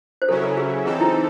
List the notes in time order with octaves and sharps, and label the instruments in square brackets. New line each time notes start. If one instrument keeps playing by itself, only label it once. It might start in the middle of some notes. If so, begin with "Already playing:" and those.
[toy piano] C5
[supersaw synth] C#3 F#3 C#4 E4 [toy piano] A4
[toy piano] A4
G#4
[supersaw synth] E3 C4 D#4 A4 [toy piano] G#4
[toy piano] E4